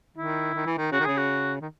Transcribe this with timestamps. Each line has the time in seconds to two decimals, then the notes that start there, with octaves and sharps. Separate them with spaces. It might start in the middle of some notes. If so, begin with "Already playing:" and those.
0.17 D#3 E4
0.55 D#3
0.66 E3
0.78 D#3
0.92 C#3 F#4
1.00 D#3
1.04 C#3 G#4
1.17 F#4
1.61 D#3